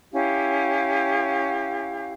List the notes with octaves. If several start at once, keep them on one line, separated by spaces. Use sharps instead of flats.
C#4 E4 G4 F5